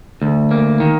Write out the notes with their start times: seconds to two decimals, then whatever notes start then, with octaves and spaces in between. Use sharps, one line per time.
0.22 D2
0.51 A#3
0.80 D#3